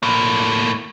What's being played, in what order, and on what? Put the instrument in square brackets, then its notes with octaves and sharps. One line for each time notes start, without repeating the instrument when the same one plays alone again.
[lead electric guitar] A2 A#3